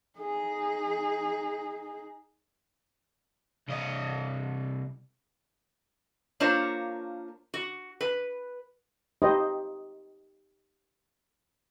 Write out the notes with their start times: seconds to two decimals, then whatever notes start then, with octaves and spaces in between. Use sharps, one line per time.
0.18 D#4 G#4
3.69 C2 D#5
6.40 A#3 D4 F4 A#4 C5 C#5
7.54 F#4
8.01 B4
9.22 D#4 G4 C5 D#5